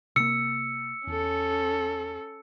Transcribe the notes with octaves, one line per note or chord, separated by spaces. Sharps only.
C3 A#3 E6 C#7
E2 C#4 A4